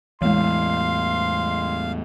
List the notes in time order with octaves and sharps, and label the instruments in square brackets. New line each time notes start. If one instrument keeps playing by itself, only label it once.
[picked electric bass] E2 A2 [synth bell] E3 G#3 [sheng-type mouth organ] F5 [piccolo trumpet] C6